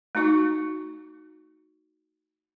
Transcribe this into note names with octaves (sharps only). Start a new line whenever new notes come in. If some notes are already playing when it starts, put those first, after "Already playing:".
A3 D#4 F#4 C#6